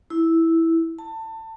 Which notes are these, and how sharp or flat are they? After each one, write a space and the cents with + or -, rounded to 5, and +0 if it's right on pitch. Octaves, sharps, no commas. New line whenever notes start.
E4 -5
A5 +25